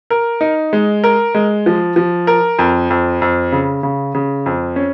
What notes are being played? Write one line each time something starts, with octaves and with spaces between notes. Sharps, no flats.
A#4
D#4
G#3
A#4
G#3
F3
F3
A#4
F2
F2
F2
C#3
C#3
C#3
F2
C#4